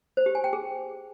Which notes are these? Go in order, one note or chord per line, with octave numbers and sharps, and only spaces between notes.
C5
G4
G#5
G5
G#4